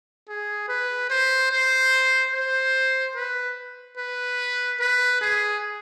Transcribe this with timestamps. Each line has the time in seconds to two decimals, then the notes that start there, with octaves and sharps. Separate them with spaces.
0.29 G#4
0.69 B4
1.10 C5
1.51 C5
2.34 C5
3.16 B4
3.97 B4
4.80 B4
5.21 G#4